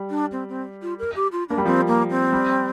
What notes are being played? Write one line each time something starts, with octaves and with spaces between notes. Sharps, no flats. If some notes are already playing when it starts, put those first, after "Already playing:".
Already playing: G3
D4
C4
C4
F4
A#4
G4
F4
A#3 D4
G3
F3 C4
A#3
C4
G3